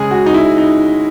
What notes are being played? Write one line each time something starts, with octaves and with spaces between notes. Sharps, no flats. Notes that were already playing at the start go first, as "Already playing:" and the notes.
Already playing: C#3 G#3 G#4
F#4
D#4
E4
D#4